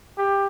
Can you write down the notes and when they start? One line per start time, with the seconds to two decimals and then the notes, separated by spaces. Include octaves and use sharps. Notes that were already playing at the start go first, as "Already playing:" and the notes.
0.18 G4